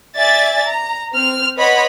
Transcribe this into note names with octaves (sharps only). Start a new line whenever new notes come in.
D5 E5 G#5 A6
A#5
C4 F6
B4 C#5 D#5 F#5 B5 C6